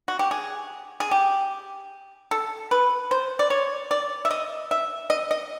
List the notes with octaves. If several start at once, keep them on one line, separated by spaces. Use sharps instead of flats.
F#4
G4
G#4
G#4
G4
A4
B4
C5
D5
C#5
D5
E5
D#5
E5
D#5
D#5